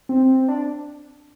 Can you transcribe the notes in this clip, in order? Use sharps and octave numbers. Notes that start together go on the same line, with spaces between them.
C4
D4